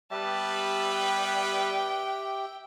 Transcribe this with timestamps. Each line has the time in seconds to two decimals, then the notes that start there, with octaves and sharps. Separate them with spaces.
0.11 G3 B3 G4 B4 E5 A5
0.91 G5